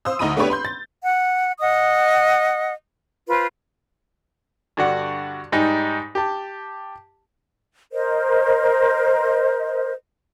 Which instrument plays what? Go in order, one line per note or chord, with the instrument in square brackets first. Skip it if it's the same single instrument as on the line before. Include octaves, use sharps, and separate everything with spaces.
[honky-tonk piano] C5 F5 D#6 E6
D2 D#4 A#5 B5 D#6 D#7
A3 B3 D4 G4 B4 C#5
B5 C6 G6
A6
[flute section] F#5
D#5 F#5 D#6
F4 B4 C5
[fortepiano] G2 D3 D4 F#4 F#5
G#2 G3 D#4
G4 A5
[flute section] A#4 C5 D#5